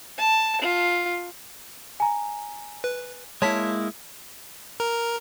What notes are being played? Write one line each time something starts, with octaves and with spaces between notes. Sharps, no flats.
A5
F4
G#5 A#5
B4
G#3 A#3 E4 C#5 A5 B6
A#4